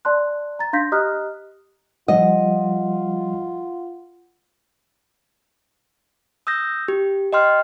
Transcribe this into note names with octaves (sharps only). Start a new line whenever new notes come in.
D5 A5 C6 F#6
A#5 A6
D4 F5 C6 G6 A#6 B6
G4 D#5 A#5 D#6 F6 F#6
F3 G3 F4 D#5 F#5
D#6 E6 G6 A#6
G4
D#5 G5 C6 F6